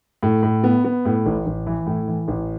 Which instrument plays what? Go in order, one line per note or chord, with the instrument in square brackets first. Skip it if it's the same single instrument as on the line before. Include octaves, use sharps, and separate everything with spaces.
[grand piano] A2
A2
B3
B3
A2
A1
A1
E3
A2
E3
A1